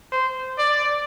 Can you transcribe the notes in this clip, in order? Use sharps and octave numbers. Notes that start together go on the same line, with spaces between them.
C5
D5